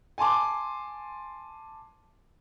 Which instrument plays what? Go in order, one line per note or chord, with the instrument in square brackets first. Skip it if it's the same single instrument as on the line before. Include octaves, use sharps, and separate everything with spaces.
[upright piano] G#5 A5 C6 D6